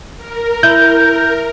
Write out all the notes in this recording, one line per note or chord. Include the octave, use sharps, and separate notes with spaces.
A#4
E4 G6